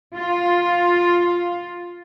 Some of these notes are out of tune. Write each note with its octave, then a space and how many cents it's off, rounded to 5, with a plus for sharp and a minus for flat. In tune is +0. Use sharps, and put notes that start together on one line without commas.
F4 +5